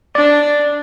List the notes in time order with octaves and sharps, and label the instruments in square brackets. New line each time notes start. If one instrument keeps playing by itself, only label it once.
[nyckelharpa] D4 [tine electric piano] D5